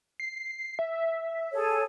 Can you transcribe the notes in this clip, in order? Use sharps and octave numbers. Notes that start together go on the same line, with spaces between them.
C7
E5
G#4 A4 C#5